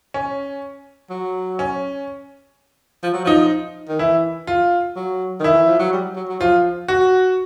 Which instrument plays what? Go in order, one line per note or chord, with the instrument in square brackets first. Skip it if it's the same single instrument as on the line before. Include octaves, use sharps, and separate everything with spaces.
[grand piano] C#4
[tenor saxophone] F#3
[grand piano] C#4
[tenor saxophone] F3
F#3
[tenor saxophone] F3 [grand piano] D#4
[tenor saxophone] D#3
[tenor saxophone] E3 [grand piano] E4
[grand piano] F4
[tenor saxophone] F#3
[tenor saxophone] D#3 [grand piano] E4
[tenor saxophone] E3
F3
F#3
G3
F#3
F#3
[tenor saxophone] F3 [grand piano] F4
[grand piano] F#4